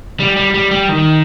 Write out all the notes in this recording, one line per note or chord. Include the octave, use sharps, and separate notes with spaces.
G3
G3
G3
G3
D#3